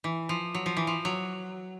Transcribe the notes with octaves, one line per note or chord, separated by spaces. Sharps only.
E3
F3
F#3
F3
E3
F3
F#3